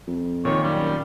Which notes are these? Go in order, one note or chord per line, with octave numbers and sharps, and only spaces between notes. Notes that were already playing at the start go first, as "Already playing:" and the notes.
F2
A#2 D#3 C#5
F#2 G3